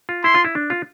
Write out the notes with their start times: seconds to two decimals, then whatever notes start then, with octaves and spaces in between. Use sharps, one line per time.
0.09 F4
0.24 E4 C6
0.34 F4
0.44 E4
0.55 D4
0.70 F4